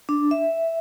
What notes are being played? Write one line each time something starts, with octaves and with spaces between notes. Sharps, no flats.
D4
E5